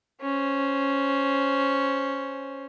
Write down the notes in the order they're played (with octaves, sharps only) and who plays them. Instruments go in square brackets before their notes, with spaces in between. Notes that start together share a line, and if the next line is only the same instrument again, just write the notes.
[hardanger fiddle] C#4 C5